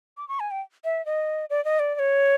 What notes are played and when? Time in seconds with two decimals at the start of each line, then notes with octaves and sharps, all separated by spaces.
0.17 D6
0.29 C#6
0.40 G#5
0.51 G5
0.84 E5
1.06 D#5
1.50 D5
1.65 D#5
1.79 D5
1.95 D5
1.99 C#5